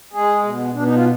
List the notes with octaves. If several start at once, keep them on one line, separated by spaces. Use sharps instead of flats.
G#3 G#4
B2
B2 D4
D#4
F4